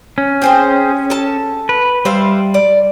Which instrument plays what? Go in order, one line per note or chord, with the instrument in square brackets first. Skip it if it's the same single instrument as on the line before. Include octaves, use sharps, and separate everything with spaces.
[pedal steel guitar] C#4
[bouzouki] C4 G#4 C5
A4 A5
[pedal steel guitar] B4
[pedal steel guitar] G3 [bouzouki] C5 E5 F5
[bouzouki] D5